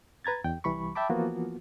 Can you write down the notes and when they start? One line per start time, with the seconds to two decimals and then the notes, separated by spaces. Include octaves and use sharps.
0.25 B4 A#5 G#6 A6
0.44 E2 G5
0.64 C2 E3 G3 B5 C#6
0.95 E5 G5 A5 B5 D6
1.09 E3 F3 A#3 B3 F4 F#4